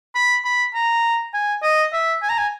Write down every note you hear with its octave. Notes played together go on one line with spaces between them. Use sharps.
B5
B5
A#5
G#5
D#5
E5
G#5
A#5
G#5